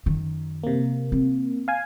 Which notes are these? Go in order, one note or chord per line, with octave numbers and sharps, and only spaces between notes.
F#2 D#3
C3 A#3
C4
F5 G#5